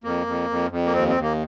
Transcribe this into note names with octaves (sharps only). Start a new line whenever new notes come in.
F2 A#3
F2
F2
F2
A#3
D#2 C4
C4
D#2
A#3